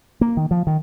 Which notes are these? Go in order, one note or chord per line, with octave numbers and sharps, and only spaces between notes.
A#3
D#3
F3
D#3